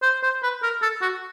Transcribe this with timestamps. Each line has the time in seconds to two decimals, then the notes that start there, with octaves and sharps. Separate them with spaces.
0.02 C5
0.23 C5
0.43 B4
0.63 A#4
0.82 A4
1.01 F#4